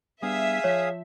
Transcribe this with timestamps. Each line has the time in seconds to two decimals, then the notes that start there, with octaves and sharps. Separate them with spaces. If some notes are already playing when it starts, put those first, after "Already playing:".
0.22 G3 B3 D4 G#4 E5 F5 D#6
0.64 F3 C#5